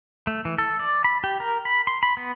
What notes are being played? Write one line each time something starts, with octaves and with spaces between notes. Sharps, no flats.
A3
E3
A4
D5
B5
G4
A#4
B5
C6
B5
B3